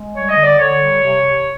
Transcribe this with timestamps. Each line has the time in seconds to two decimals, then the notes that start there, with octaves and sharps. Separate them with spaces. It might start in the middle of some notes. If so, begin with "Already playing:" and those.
Already playing: G#3
0.13 G3 C#5
0.29 D#5
0.36 D3
0.43 D5
0.59 D3 C#5
0.81 G3
1.04 C3
1.25 C3